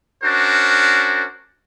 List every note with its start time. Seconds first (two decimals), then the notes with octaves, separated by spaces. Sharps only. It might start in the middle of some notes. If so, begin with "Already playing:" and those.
0.23 C#4 D4 F#4 A#4 C5